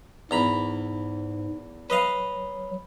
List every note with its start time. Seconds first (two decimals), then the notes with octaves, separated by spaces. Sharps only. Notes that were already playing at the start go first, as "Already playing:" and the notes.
0.31 E2 G#2 A#5 B5
1.90 F#3 B4 D#5 F5